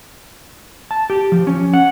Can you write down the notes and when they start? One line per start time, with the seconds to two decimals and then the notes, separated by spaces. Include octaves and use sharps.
0.91 A5
1.10 G4
1.32 F3
1.47 C#4
1.74 F#5